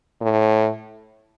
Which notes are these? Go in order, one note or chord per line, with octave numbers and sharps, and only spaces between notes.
A2